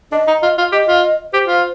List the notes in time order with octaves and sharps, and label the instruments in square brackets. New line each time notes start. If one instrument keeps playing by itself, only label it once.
[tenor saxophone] D4 [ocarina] D#5
[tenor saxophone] D#4
F4
F4
[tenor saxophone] G4 [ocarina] D#5
[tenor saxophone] F4
[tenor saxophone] G4 [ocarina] C5
[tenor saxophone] F4